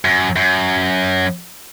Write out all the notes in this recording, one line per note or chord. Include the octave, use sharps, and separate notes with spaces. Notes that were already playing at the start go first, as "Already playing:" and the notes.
F#2
F#2